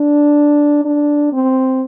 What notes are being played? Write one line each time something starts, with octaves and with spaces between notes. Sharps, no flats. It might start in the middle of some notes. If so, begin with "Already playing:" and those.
Already playing: D4
D4
C4